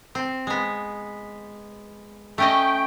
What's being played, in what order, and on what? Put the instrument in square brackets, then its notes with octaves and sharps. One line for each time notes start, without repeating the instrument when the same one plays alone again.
[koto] C4
G#3 B3
[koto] A3 C#4 D#5 [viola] G5